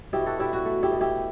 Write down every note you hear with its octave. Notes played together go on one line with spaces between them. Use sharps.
B2 E4 G4
F#4 A4
D4 E4 G4
F#4
A3
E4 G4
B2
E4 G4